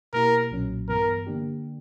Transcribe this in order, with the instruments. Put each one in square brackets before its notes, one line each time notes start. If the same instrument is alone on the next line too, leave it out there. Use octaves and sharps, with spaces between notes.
[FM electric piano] B2 A#3 E4 G4 [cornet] A#4
[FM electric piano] B1 A#2 F#3 C#4
[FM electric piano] G2 E3 B3 [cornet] A#4
[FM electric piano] D3 A#3 D4 G4